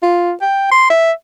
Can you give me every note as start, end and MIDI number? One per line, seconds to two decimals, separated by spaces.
0.03 0.32 65
0.41 0.69 79
0.71 0.86 84
0.90 1.12 76